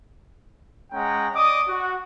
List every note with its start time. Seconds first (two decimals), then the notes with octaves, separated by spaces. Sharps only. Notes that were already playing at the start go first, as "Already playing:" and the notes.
0.92 G#3 C#4 F#5 G5 A#5
1.35 D5 D#5 D6 D#6
1.68 F#4